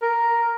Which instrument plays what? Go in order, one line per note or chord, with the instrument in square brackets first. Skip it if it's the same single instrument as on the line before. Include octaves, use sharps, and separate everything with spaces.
[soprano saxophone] A#4